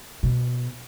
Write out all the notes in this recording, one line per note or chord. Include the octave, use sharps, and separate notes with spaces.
B2